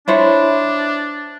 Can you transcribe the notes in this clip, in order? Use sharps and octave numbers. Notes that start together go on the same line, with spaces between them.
D4 E4 C5 C#5